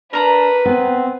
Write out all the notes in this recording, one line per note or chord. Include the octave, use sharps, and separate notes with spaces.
D4 A#4 B4 A#5 B5
B3 C4 G#5